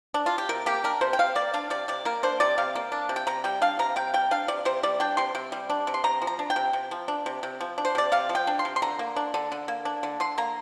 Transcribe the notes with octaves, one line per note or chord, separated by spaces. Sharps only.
D4
F4
G4
C3 A#4
A#3 G4
D4 A#4
C3 C5
G5
C3 F5
A#3 D5
D4 F5
C3 D5
C3 D5
A#3 A#4
D4 C5
C3 D5
C3 F5
A#3
D4
C3
G5
C3 A#5
G3 G5
D4 F5
C3 A#5
C3 G5
G3 G5
D4 F5
C3 D5
C3 C5
G3 D5
D4 G5
C3 C6
C3
G3
D4
C3
C6
C3 A#5
F3
A#5
D4
G5
C3
C3
F3
D4
C3
C3
F3
D4
C5
C3 D5
C3 F5
F3
G5
D4
C6
C3
C6
D3 A#5
A#3
D4
D3
D3
A#3
D4
D3
D3 C6
A#3 A#5